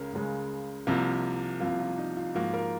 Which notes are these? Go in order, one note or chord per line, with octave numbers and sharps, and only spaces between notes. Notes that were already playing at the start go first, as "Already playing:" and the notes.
Already playing: C#2 C#3 G#3 A#4
C#2 C#3 G#3
C2 C3 F3 A#3
C2 C3 F3 A#3 F4
F4
D#4
F4
G#2 F3 A#3 F#4
A#4